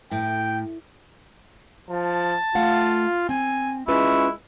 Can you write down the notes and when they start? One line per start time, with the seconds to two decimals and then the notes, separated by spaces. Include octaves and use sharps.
0.11 A2 G5
1.90 F3 A5
2.55 A3 F4 F5 F#5
3.29 C4 G#5
3.88 G#3 C#4 E4 F4 B4 C#6